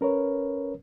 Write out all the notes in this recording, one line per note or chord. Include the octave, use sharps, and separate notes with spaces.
C#4 A#4 B4 C#5